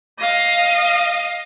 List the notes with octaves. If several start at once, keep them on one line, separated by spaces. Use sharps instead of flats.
D#5 F5